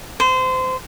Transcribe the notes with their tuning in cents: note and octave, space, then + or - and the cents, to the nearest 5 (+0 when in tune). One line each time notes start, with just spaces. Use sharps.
C5 -25